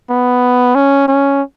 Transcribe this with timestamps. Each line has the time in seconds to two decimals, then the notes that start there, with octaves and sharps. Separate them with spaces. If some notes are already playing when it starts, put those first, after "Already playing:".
0.10 B3
0.75 C#4
1.08 C#4